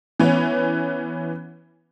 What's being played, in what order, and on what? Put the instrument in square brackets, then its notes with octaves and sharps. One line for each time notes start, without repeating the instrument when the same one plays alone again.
[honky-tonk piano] E3 B3 C#4